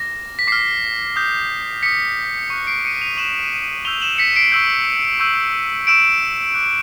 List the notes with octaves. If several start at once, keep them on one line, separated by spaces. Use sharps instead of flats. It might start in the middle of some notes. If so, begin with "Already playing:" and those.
Already playing: D6 F6 A#6
B6
D6 F6 C7
D#6 G6
D#6 G6 B6 C#7
C#6 F#6
C7 D7
C#7 D#7
D#7 F7
C#6 F#6 E7 F#7
C#6 E6 G6 F7 G7
E7 F#7
B6 C#7
C7 D7
C#6 E6 G6
C#6 E6 G6
C#6 E6 G6 D7 E7
D6 F#6